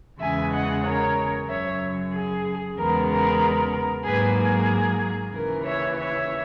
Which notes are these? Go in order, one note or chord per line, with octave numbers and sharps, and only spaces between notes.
E2 C#3 E3 G#3 E5 G#5
D#5 F#5
A#4 C#5
F#2 C#3 F#3 C#5 E5
G#4
E2 C#3 G#3 B3 A#4
A#4
G#2 F#3 A#3 G#4 B4
G#4
D#2 C#3 E3 A#4
C#5 E5
C#5 E5